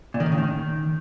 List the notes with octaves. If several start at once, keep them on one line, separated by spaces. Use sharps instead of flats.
A#2
D#3
A2
C#3
D#3